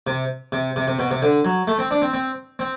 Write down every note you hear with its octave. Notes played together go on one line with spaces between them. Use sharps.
C3
C3
C3
C3
B2
C3
D3
F#3
A3
C4
D4
C4
C4
C4